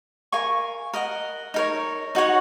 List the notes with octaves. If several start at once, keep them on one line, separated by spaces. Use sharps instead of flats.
A#4 F5 G#5 C#6
A#4 D#5 F#5
D#4 A#4 C#5
D#4 F#4 C#5 F#5